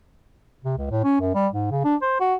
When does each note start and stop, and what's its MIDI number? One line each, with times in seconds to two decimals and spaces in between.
0.65 0.76 48
0.78 0.90 37
0.91 1.00 45
1.04 1.17 61
1.21 1.33 42
1.35 1.48 55
1.53 1.71 44
1.71 1.80 49
1.85 1.96 62
2.02 2.19 72
2.21 2.35 66